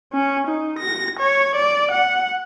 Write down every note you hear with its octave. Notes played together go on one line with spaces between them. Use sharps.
C#4
D#4
A#6
C#5
D5
F#5